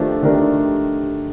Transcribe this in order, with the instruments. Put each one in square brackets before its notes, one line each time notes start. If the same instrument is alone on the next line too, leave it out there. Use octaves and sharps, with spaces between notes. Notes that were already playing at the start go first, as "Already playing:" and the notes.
Already playing: [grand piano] D#3 A3 D4 G4 [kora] F3
[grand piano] D#3 A3 D4 G4 A#4